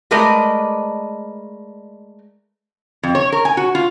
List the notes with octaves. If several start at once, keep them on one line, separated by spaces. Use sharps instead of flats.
G#3 A3 A#4 B4 D5 D#5
F2
C#5
A#4
G#5
F#4
F4